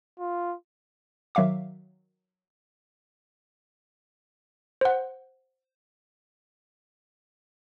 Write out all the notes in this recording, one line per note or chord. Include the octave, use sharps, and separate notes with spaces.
F4
D#3 F#3 E5 F5 D6
C5 F#5